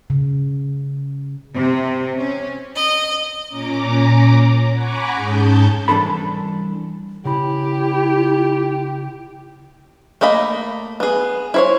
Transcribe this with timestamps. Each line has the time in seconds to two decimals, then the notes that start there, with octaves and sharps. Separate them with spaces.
0.10 C#3
1.56 C3
2.18 C#4
2.76 D#5
3.46 A#2 C#4 A#5 D6
4.72 F#5 G#5 A#5 B5 C#6 D6
5.14 G#2 C#4 G#4 A5 G6
5.88 C2 C3 E3 D4 A4 B5
7.25 C#3 E4 G4 B5
10.21 A3 A#3 D#5 B5
11.00 B3 G#4
11.54 E4 C5 C#5